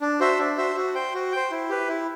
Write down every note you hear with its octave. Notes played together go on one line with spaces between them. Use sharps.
D4
F#4 C5 E5
D4
F#4 C5 E5
F#4
C5 G5
F#4
C5 G5
E4
G4 B4
E4